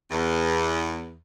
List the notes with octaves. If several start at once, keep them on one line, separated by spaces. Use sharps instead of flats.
E2